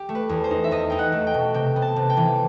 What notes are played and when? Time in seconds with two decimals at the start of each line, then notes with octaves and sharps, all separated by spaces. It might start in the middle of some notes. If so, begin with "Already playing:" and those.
Already playing: G4
0.09 A3
0.15 B4
0.29 E2
0.44 C5
0.51 D#4
0.64 E5
0.71 E2 D#5
0.90 D#4 G5
0.99 F#5
1.12 A3
1.27 G5
1.34 B2
1.54 C3 G5
1.76 B3
1.82 A5
1.96 C3
2.10 G5
2.17 E3